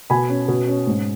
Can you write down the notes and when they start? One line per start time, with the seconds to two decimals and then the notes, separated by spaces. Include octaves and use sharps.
0.10 B2 G#5 B5
0.30 C#4
0.48 B2
0.68 C#4
0.87 G#2